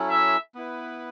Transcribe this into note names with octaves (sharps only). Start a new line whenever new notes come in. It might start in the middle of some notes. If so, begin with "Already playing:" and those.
Already playing: F#3 C#4 E4 A4
E5
B3 E4 B4